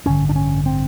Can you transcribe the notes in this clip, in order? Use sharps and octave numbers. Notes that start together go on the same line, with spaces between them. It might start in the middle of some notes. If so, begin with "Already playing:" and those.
A1 G2 D3 C#4
D4
C#4
C4